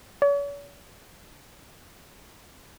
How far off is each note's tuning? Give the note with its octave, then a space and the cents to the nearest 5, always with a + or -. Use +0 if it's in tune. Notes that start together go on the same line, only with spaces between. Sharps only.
C#5 +45